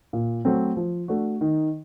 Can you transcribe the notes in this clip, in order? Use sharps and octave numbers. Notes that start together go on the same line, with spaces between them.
A#2
F#3 A3 C4
F3
A3 D4 F#4
D#3